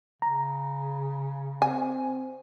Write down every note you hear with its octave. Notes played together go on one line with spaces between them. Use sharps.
C#3 A#5
C4 G#5